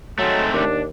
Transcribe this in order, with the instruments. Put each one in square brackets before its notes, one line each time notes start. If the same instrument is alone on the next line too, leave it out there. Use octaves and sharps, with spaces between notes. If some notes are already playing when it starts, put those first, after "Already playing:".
[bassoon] F#3 [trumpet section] G#3 D#4 A4 [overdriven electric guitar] A3 C4
[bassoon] D#2 [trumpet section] D4